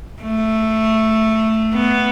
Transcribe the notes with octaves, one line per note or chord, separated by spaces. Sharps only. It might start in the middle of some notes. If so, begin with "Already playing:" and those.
A3
B3